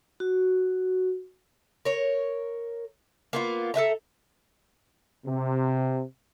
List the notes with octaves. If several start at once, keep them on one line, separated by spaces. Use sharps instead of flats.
F#4
A#4 C#5
A#3 B3 F4
A4 B4 E5 A#5
C3